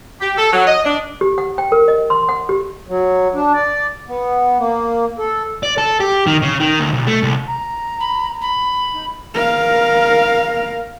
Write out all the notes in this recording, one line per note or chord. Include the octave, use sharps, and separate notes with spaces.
G4
A4
F#3
D#5
D4
G4
F#5
G5
A#4
D#5
C6
F#5
G4
F#3
D4
D5
B3
A#3
A4
D5
A4
G4
D#3
C#3
D#3
D2
B1
A3
C2
A#5
B5
B5
D#4
A#4 F5